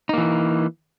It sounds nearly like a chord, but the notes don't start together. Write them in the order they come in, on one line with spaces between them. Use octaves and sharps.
D#4 A#3 E3